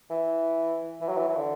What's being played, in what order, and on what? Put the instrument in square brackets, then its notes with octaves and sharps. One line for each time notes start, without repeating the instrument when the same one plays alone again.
[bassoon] E3
E3
F#3
E3
E3
D3